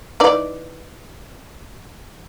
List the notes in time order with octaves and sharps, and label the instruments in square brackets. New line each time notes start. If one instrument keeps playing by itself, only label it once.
[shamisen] E3 D#4 D5